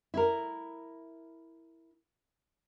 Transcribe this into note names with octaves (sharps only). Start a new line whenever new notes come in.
E4 A#4